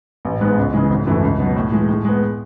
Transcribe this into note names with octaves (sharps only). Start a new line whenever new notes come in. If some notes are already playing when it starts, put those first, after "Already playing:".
A1
G#2 G#3 B3
C#2
C#3 E3 G#3
G#1
F#2 E3 A3 E4
C#2
B2 F#3
A2
E3 G#3
A2
G#3 B3